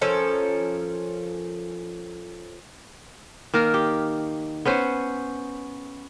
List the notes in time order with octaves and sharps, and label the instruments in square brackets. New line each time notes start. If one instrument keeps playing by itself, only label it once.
[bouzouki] F3 C#4 A4 A#4
[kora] D#3 A#3 A#4
G4
B3 C#4 B4 C5